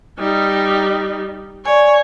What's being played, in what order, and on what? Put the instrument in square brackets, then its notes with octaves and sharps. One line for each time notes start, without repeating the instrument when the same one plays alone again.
[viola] G3 D#4
[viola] C#5 [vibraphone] D5 G#5